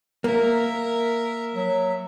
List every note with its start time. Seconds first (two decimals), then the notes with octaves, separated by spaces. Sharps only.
0.24 A#3 A#4 E5
1.55 F#3 E5